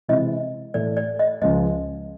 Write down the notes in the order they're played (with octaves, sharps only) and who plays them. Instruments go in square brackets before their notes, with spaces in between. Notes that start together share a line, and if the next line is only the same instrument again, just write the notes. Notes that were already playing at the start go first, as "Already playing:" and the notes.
[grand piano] C3 E3 G#3 C4 E4 [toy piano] D#5
[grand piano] A2 E3 A3 [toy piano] D5
[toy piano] D5
D#5
[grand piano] C#2 C#3 F3 G#3 [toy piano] D#5